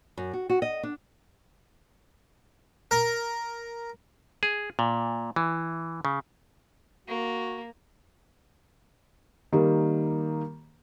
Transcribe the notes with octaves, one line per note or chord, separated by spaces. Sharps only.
F#2
F#4
F#4
D#5
D4
A#4
G#4
A#2
E3
C#3
A#3 F#4
D#3 G3 A#3